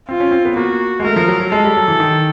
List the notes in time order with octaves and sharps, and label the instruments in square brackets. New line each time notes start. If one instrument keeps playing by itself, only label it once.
[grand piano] C4 [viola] F4
[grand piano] C#4
C4
B3
[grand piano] A#3 [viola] F#4
[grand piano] G#3
[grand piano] A3 [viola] A#4
[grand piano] F3
F#3
F#3
[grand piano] G#3 [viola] A4
[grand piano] G3
F#3
E3
D#3